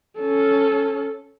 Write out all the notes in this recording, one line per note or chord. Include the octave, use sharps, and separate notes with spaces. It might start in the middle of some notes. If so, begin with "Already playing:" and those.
C#4 A4